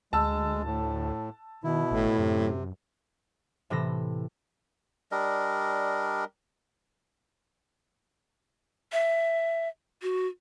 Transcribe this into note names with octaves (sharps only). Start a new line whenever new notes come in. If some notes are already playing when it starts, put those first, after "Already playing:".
D2 G#3 A5 E6
A2
B2 D#3 E4
G#1 A2
F#2 C3
A2 C3 E3 A4 A#6
G3 D4 A#4 D#5
E5
F#4